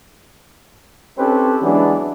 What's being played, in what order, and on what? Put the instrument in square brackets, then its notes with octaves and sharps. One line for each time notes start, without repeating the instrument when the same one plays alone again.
[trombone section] C4 C#4 D#4 G4 A4 B4
E3 F#3 G#3 B3 D4